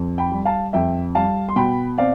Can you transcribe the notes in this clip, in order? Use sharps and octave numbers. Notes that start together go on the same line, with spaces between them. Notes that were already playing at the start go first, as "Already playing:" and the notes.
Already playing: F2
G5 B5
G3
F5 A5
F2 E5 G5
G3 F5 A5
C6
B2 G5 B5
C4 D5 F5